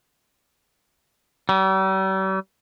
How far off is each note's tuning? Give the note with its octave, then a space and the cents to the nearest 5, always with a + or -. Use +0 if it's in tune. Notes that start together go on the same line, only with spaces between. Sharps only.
G3 -45